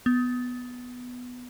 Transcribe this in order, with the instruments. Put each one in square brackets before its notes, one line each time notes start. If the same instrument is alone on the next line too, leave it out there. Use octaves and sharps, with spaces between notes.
[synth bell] B3